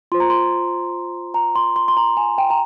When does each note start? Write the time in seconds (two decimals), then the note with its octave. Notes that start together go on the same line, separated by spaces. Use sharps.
0.12 F4 C5 C6
0.20 A#5
0.30 C6
1.34 A#5
1.56 C6
1.76 C6
1.88 C6
1.97 A#5
2.17 G#5
2.38 G5
2.50 A#5